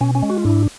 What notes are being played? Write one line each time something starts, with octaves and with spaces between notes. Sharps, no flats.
B2 C#4
C#4
G#3
F#4
F4
G#2 D4 E4